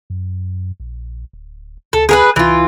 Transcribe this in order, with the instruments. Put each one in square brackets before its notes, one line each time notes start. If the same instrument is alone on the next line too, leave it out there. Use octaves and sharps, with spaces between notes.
[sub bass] F#2
A#1
D1
[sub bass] D2 [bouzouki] A4
[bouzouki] G#4 A#4 B4
[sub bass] C#2 [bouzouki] E3 F4